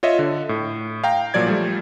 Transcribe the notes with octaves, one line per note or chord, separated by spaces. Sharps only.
F4 C#5 D#5 E5
D3
A2
F5 G5 A#5
A#2 F3 F#3 D5 G#6
F3 G3 A3